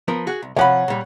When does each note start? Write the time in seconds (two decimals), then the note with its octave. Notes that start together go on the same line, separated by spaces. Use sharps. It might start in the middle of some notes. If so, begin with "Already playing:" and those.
0.08 F3 B3 A#4
0.27 F#4 G#4 F#5
0.42 C2
0.56 C3 F3 C#5 F#5 B5
0.88 A#2 G3